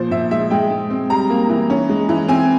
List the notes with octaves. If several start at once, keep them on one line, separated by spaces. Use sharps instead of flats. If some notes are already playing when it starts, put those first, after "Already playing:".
Already playing: A#2 F3 C5
A#2 E5
G#3 E5
G#3 G5
G#3
C4
G3 A#5
A#3
E3
C#4
G#3
E3
C4 G#5